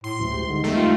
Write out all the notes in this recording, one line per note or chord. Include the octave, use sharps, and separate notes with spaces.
A2 C6
D2 A#2 C#3 F#3
G#3 G4
D3 G3 G#3 D#4
E2 D#3 A3
F4